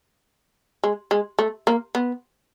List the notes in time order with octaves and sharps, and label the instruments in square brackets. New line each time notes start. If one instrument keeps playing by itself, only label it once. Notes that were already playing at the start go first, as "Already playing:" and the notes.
[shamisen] G#3
G#3
A3
A#3
B3